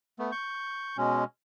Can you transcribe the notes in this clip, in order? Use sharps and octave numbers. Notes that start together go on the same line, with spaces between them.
A3 B3
C#6 G6
B2 G#3 C#4